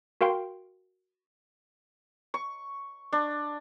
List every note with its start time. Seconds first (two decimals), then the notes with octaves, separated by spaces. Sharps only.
0.21 F#4 A#4 F5 G5 C6
2.34 C#6
3.12 D4